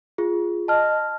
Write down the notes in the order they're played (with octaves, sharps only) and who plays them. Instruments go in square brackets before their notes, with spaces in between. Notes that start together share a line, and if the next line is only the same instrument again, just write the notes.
[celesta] F4 G#4
[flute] D#5 [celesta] A5 F6